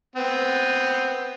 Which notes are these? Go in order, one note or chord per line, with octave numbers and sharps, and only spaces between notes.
B3 C4